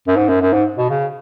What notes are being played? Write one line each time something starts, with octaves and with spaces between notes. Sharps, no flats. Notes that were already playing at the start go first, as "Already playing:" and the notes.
F#2
G#2
F#2
F#2
G#2
B2
C#3